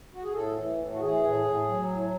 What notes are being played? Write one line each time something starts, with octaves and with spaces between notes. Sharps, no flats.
F#4
G#4
A2 A4
E3
A2
F#4
E3 G#4
A2
A2
F#3
A2